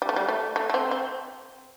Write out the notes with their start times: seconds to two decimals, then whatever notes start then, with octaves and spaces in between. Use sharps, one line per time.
0.02 G3
0.09 A3
0.16 G3
0.28 A3
0.56 A3
0.70 A3
0.74 C4
0.91 C4